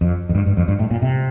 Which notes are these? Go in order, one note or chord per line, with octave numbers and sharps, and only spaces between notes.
F2
F2
G2
G2
F2
G2
A2
A#2
C3